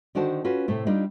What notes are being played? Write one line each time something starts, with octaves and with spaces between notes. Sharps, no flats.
D3 D#3 D4 F#4 C5 A5
C#4 F4 F#4 B4
A2 C3 A3
G3 D4 D#4 F4